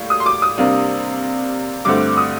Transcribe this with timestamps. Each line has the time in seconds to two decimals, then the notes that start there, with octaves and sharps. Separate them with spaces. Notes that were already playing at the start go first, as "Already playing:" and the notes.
Already playing: A2 G3 A#3
0.10 D#6
0.20 C6
0.26 D6
0.42 D#6
0.58 C3 G3 A#3 D4
1.85 G2 D3 A3 C4 D6
2.17 D#6